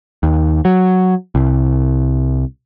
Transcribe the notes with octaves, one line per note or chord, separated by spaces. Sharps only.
D#2
F#3
C2